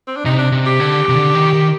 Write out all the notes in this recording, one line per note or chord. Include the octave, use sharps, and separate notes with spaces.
C4
D4
C3 D#4
D4
C3
G4
D3
C3
D3
D#3
D#3